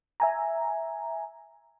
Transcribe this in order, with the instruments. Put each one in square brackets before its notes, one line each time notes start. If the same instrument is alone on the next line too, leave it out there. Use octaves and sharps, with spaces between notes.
[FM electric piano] E5 G#5 A#5